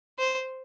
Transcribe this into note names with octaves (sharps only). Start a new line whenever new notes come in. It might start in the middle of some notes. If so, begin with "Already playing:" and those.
C5